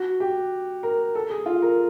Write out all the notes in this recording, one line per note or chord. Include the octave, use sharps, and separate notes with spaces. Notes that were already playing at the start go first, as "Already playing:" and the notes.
Already playing: F#4
G4
A#4
A4
G#4
F4
A#4